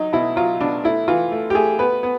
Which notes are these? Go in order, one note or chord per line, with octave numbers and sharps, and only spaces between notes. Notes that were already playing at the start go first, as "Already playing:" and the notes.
Already playing: F#3 D#4
B2 E4
F#3 F4
B2 D4
A3 E4
E3 F4
A3
G4
A3 G#4
B3 B4
B3